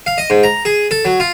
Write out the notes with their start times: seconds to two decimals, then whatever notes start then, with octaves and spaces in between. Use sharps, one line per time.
0.06 F5
0.18 D#5
0.30 G#2
0.43 A#5
0.65 G#4
0.91 A4
1.05 F#3
1.20 F4